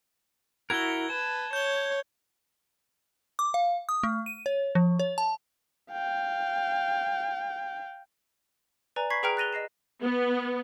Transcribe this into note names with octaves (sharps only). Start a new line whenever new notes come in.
E4 F#4 A#4 G#6 G7
B4 A5
C#5 G6 G7
D6
F5
D#6
A3
D#7
C#5
F3
C#5
A5
F5 G5
B4 D5 G#5 A#5
B5 C#6 G#6 B6 C7
G#4 B4 G5 A#5 F6 D7
F#6 A6 A#6 D#7 F7 G7
D#5 A#6 C7 E7
B3